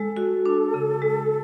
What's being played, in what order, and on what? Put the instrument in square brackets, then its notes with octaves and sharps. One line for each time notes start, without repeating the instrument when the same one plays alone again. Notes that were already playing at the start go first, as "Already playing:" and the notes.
Already playing: [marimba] G#3 [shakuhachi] A4
[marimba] F#4
D4
C#3
G#3